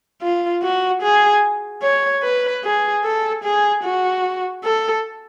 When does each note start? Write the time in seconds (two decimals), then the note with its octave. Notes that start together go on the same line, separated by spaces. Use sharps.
0.22 F4
0.63 F#4
1.03 G#4
1.83 C#5
2.23 B4
2.64 G#4
3.04 A4
3.44 G#4
3.84 F#4
4.64 A4